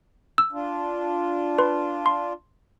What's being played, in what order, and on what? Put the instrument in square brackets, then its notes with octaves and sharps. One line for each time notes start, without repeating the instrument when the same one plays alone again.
[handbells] E6
[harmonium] D4 F4
[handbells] B4 C6
C6